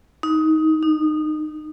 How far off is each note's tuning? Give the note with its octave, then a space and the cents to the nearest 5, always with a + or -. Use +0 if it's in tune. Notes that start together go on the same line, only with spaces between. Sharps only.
D#4 +20
D#4 -25